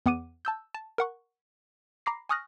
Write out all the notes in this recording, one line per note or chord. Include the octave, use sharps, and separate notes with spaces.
E2 B3 F#5 D6 D#7
A5 E6 G6
A5
A#4 F#5 C#6
A#5 B5 D6 A#6 C7
G#5 C#6 D#6 F6 F#6 A#6